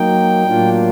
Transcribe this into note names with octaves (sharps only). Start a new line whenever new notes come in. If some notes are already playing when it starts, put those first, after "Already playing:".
Already playing: F#3 A#3 D#4 G5
A2 F#3 A#3 D4 F4